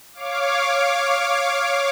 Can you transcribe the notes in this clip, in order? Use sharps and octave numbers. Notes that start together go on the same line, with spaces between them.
C#5 F5 D6